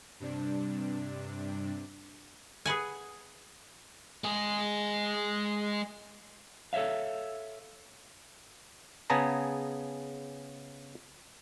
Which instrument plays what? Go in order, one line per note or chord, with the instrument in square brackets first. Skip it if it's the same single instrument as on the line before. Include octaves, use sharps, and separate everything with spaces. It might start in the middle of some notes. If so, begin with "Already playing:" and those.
[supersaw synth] G2 C3 D4
[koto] G#4 B4 F#5 G#5
[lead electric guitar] G#3 G#4
[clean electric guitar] A4 C#5 D5 E5 F5
[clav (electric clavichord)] C#3 B3 G#4 A5 A#5